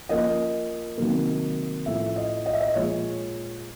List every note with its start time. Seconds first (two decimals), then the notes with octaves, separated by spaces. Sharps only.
0.09 F3 A#3 C#4 D#5
0.98 C3 D#3 F#3 A#3
1.86 A2 F3 A3 C#4 E5
2.16 D#5
2.46 D#5
2.53 E5
2.61 D#5
2.75 A#2 F3 G#3 C#5